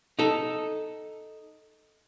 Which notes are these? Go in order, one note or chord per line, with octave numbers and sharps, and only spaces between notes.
D#4 A4